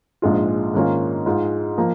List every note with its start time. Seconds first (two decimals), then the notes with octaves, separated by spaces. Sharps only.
0.22 A#1 G#2 G#3 F4
0.74 G#2 D#3 A#3 C#4 F4
1.26 G#2 G#3 F4
1.78 F3 A#3